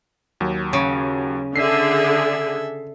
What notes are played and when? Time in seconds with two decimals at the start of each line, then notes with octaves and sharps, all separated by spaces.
0.40 D#2 F#3
0.73 C#3
1.56 D3 G#4 A4 E5 B6 C7